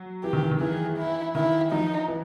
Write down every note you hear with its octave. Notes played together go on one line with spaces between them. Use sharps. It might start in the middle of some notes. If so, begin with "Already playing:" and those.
Already playing: F#3
E3 G4
D#3
E3
D#3
E3 G#4
E4
D#3 E4
F3 D#4
E3